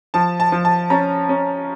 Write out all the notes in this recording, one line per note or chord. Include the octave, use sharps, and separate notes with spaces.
F3 A5
A5
F3
A5
C#4 A#5
C#4